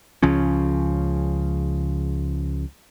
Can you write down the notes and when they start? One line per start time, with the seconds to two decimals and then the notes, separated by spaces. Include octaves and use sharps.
0.23 C#2 C#3 F3 C#4